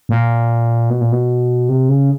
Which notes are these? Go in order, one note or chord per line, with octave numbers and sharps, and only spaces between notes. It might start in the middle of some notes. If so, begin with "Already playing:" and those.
A#2
B2
A#2
B2
C3
C#3